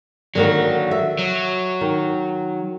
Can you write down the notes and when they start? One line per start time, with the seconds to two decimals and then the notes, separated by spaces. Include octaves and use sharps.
0.35 D3 D#3 F#3 A#3
0.91 E5
1.19 F#3
1.81 D#3